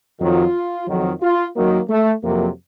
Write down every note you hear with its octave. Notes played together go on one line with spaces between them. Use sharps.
F2 D#3 F#3 F4
F2 D#3 F#3
F4
F#2 D#3 F#3 A#3
A3
F2 C3 F#3 A#3